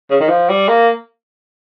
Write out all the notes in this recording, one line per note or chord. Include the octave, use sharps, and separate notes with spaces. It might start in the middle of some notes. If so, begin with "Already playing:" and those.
C#3
D#3
F3
G3
A#3